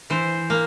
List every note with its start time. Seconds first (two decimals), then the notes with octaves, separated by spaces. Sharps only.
0.10 E3 C5
0.50 A#3